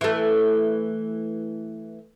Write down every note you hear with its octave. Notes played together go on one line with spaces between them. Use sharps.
E3 A3